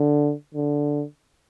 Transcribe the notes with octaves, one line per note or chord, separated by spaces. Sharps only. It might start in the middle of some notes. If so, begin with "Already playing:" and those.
Already playing: D3
D3